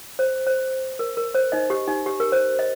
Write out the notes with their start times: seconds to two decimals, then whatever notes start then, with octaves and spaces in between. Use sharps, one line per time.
0.19 C5
0.47 C5
0.99 A#4
1.17 A#4
1.35 C5
1.52 D#4 D#5
1.70 G4
1.88 D#4
2.06 G4
2.20 A#4
2.32 C5
2.59 D#5